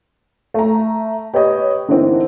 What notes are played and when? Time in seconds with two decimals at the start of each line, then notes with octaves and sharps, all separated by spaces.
0.54 A3 A#5
1.34 G4 B4 C#5 D#5
1.88 D3 E3 A#3 C4 D#4